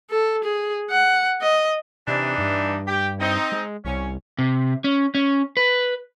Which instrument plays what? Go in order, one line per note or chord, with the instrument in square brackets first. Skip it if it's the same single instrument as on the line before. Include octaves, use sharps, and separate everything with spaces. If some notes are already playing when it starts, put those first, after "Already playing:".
[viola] A4
G#4
F#5
D#5
[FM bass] C3 [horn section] E3 D4 D#4
[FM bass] G2
[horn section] G4
C4 D#4
[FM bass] G#3
[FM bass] C2 [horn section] C#4
[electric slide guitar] C3
C#4
C#4
B4